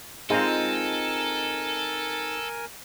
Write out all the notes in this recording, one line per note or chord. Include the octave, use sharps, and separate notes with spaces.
G#3 C4 D#4 F4 A4 A#4 G#5